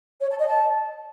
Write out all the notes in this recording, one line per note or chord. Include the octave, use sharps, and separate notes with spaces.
C#5
A5
D#5
A5